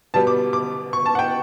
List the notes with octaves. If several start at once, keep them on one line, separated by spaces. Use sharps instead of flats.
B2 G3 B3 A5
D6
D6
C#6
A5
F#5
G5